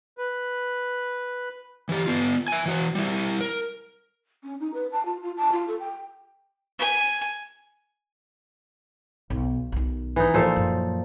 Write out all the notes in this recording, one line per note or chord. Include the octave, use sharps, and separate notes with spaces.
B4
E3 G4
B3 F4
E5 G#5
E3 F#4
G3 E4
A#4
C#4
D#4
B4
A5
F4
F4
A5
F4
A4
G5
G#5
B1
B1 D#3
E3 D#4
A#2 F3 A4
F#2